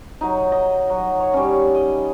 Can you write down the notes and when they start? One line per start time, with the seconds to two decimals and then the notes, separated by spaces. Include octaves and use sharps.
0.21 F#3 D#4
0.52 D#5
0.90 F#3
1.20 C#5
1.34 G3 C#4
1.75 D#5